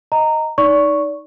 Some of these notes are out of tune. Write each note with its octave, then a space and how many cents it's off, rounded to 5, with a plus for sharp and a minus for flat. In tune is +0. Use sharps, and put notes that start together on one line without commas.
D#5 +0 A#5 -15
D#4 +0 D5 -30 C#6 +0